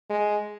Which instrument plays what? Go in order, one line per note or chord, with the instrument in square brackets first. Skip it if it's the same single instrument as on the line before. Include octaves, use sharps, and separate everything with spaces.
[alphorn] G#3